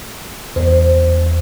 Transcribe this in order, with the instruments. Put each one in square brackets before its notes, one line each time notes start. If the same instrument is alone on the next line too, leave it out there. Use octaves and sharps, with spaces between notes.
[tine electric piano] E2 [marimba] C5